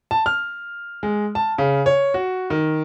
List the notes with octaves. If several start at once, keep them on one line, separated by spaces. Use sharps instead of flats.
A5
F6
G#3
A5
C#3
C#5
F#4
D#3